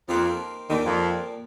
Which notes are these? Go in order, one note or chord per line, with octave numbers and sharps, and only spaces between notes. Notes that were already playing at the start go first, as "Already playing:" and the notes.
F2 F3 A#3 D#4 G4 C5
D#2 A#2 D#3 G3 A#3 G4
F2 F3